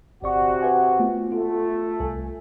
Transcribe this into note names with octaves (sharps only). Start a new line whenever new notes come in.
G1 C3 F#4 D5 C#6
B4 E5 G#5
A3 B3 F4
A3 F4
C2 A4 G#5